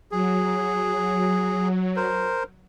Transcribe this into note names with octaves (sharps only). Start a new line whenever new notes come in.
F#3 G#4
A#4 C5